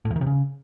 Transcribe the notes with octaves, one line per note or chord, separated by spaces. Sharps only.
A2
E2
D#3
C3
C#3